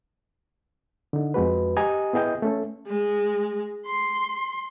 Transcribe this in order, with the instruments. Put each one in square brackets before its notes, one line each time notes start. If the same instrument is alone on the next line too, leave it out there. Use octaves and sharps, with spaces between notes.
[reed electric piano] D3 D#4
F2 G#3 F#4 B4
G4 D#5 G#5 A#5 D#6
B3 E4 G#4 D#5 G5
A3 C#4 A4
[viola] G#3
C6